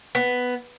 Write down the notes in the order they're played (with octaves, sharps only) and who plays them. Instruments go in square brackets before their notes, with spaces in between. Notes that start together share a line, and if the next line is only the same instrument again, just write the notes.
[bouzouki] B3